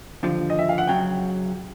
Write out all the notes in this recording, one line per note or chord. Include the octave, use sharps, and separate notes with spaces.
D#2 D3 F3
D#5
E5
F5
F#5
C#3 F#3 G5